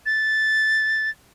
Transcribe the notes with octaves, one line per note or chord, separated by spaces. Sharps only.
A6